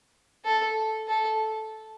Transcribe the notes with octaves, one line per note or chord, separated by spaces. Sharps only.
A4
A4